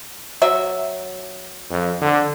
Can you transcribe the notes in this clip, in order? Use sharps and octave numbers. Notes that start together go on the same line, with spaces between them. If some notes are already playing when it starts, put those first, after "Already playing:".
F#3 E5
F2
D3